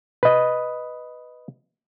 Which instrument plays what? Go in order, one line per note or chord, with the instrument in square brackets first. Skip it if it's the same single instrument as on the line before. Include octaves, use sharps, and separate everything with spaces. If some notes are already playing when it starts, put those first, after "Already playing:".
[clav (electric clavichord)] B4 D#5